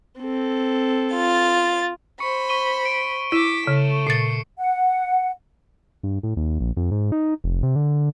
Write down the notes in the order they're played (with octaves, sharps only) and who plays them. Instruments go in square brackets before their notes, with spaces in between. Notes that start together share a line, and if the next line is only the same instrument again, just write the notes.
[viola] C4 A4
[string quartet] F4 A6
[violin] C5 B5 [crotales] C#6 C#7
[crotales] C#6 D#7 G7
D7
[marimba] E4 [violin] D6 B6 [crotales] D#7 E7
[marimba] C#3 [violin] A3
[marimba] A#2 A6 [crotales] C7 C#7
[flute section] F#5
[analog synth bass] G2
A2
D#2
A#1
F2
G#2
D#4
F1
C3
D3